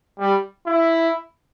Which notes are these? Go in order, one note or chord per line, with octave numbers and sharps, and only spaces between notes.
G3
E4